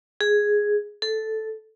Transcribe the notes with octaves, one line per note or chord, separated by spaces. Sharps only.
G#4
A4